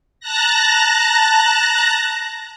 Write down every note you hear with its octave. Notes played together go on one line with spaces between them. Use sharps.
A5 A#5 F#6 A#6